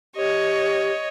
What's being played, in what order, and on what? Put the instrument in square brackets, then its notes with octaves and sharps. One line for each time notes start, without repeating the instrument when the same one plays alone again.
[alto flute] G4 [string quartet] C#5 D#5